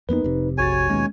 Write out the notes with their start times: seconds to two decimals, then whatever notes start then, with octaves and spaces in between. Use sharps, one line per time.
0.09 F2 A#3 B3 D#4 B4
0.24 F1 C3
0.58 A#1 F#4 C#5 G#5 A6
0.90 D#2 B2 G#3 C#4